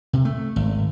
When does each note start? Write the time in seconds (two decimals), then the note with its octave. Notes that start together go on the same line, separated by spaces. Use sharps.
0.13 C3
0.25 A3
0.56 G#1